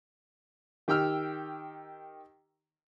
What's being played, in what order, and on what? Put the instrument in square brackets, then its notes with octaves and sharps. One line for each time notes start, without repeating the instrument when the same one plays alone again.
[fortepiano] D#3 G4 G5 E6 F6